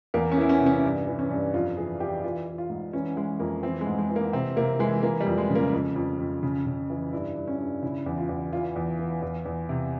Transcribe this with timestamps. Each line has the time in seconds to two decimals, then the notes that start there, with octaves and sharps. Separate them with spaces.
0.14 E2 A#3
0.32 C#4
0.37 E3 E4
0.49 C#4
0.60 C3
0.66 C#4
0.84 G2
1.07 E3
1.19 C#4
1.30 G2
1.54 F2 F4
1.77 E3 G#4
2.00 E3 G4
2.24 E3 F4
2.47 E3
2.58 F4
2.70 G#2
2.93 E3 C#4
3.16 E3 G#3
3.39 F2 A#3
3.63 E3 C4
3.81 G#3
3.87 G#2
3.98 G#3
4.10 E3
4.16 A#3
4.33 C3 C4
4.56 C3 A#3
4.79 E3 G#3
5.03 E3 A#3
5.21 G3
5.26 F2
5.38 G#3
5.50 C#3
5.55 A#3
5.73 F2
5.96 F2
6.19 F2
6.43 C#3
6.66 C#3
6.90 E3
7.13 G2 E4
7.36 G2
7.48 C#4
7.59 G2
7.82 C#3 E4
8.06 E2
8.18 F4
8.29 E2
8.52 E3 F4
8.76 E2
8.99 E3
9.22 E2
9.45 E2
9.69 C3